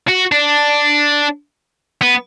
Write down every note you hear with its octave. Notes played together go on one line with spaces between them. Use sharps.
F#4
D4
B3